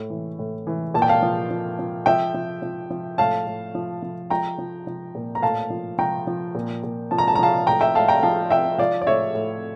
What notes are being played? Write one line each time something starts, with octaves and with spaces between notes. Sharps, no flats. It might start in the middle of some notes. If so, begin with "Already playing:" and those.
Already playing: A2
E3
A2
E3
A#2 A5
G5
F5 A5
F3
F3
F3
F3 E5 G5
F3
F3
F3
A2 F5 A5
A2
F3
F3
F3 G5 A#5
F3
F3
A#2
A#5
A2 F5 A5
F3
F3 G5 A#5
F3
A#2
A#2
F3 A5
A#5
A5
A#5
F3 F5 A5
A2 G5 A#5
E5 G5
A2 F5 A5
G5 A#5
F3 F5 A5
F3 E5 G5
F3 D5 F5
D5
A2 C#5 E5
A2